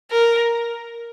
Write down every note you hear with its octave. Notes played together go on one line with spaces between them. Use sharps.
A#4